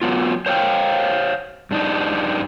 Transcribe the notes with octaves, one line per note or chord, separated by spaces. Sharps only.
F#3 B3 F4
C5 C#5 F5 G5
G2 D4 D#4